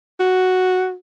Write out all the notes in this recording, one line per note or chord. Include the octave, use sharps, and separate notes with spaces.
F#4